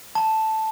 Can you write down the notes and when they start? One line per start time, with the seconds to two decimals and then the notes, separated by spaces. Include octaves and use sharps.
0.15 A5